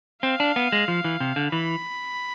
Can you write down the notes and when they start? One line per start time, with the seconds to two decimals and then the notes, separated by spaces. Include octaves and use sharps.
0.23 C4 F5
0.40 D4
0.56 B3
0.72 G#3
0.88 F3
1.04 E3
1.20 C3
1.36 D3
1.52 E3 B5